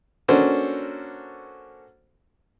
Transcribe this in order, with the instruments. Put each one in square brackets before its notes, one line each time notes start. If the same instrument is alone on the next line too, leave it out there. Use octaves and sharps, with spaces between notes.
[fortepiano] A#3 C#4 D4 F#4 A4 C5